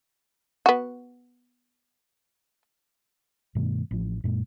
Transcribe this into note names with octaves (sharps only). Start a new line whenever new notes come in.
B3 F#4
G2 B2 D#3 A3
A1 F3
F#2 A#2 G#3